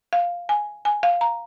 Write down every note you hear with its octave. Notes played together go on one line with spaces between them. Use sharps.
F5
G#5
G#5
F5
A#5